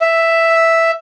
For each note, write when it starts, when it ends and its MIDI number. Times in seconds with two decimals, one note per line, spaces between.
0.01 0.91 76